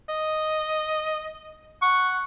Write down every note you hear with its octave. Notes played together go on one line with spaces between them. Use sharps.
D#5
F#5 C#6